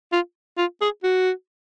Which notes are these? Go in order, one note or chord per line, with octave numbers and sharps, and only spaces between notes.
F4
F4
G#4
F#4